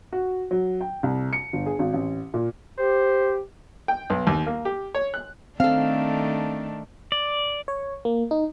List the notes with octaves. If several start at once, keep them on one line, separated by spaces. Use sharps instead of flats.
F#4
F#3
G5
C2
C#7
G1
G#4
G#1
A1
A#2
G4 C5
G5
B1
D#2
A#3
G4
C#5
F#6
D#3 A3 C4 D4 A4 F5
D5
C#5
A#3
D#4